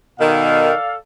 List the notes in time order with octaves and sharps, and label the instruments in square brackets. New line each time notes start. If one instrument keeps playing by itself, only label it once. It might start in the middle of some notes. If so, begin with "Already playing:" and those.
[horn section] B2 D#3 [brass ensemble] A4 D5 F5